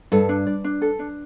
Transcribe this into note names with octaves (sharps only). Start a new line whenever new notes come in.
G2 A4
D4
D5
D4
A4
D4